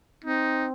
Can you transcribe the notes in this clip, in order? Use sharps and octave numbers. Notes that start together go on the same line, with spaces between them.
C4 D#4